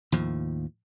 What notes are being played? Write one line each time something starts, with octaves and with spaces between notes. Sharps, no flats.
D#2 A2 F3